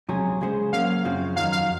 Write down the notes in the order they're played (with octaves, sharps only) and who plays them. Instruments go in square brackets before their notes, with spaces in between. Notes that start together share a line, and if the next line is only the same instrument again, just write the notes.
[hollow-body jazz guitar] C#2 C3 F#3 C#4 G#4
C#3 G#3 C#4 G#4 C5
[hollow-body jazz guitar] F#3 A#3 C#4 [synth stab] F5
[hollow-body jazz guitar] F#2 C#3 F3 C4 F#4
[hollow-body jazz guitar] F2 D#3 F#3 [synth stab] F5
[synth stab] F5